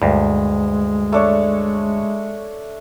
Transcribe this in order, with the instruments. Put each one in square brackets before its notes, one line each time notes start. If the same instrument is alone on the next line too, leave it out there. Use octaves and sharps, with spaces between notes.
[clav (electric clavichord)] D2 G2 [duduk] G#3
[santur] A3 D4 C#5